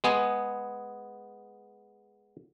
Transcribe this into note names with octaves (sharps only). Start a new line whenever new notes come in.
G#3 B3 G#4